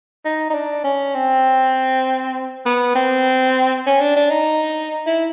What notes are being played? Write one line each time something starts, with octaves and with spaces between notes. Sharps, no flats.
D#4
D#4
D4
C#4
C4
B3
C4
C#4
D4
D4
D#4
E4